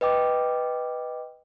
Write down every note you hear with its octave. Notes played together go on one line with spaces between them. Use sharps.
B4 D#5 G5 D6